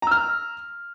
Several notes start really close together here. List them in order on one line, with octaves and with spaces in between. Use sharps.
A#5 E6 F6